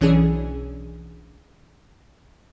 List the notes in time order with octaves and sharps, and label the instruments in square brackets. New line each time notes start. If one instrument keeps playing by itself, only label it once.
[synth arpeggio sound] B1 E3 C#4 D4 G#4